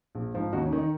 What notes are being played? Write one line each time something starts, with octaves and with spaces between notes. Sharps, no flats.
A#1
G#2 F3
D#2 D#4 F#4
C#4
D#3
D#4